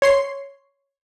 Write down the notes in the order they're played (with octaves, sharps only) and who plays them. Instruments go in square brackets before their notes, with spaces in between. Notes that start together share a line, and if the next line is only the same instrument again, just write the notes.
[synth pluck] C#5 C6 C7